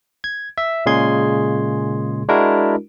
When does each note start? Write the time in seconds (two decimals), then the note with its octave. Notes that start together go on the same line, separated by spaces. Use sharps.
0.24 G#6
0.58 E5
0.86 A#2 C#3 G#3 G#4 C6 G#6
2.28 G#3 D4 E4 F#4 A#4